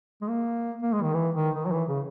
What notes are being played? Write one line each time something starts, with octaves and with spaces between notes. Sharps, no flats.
G#3
A#3
A#3
G#3
D#3
E3
D#3
D#3
F#3
E3
C#3